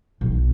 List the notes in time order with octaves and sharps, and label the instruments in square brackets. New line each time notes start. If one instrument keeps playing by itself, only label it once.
[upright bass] B1